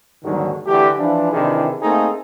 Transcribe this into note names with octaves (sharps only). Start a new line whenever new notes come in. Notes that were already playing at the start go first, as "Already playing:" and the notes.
D#2 G#2 D3 D#3 F#3 G3
D3 E3 A3 G4
E3 F3 D4
C3 D#3 E3 D4 E4 G#4
A3 A#3 C4 D#4 G#4 A4